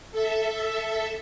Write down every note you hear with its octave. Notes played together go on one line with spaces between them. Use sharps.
A4 E5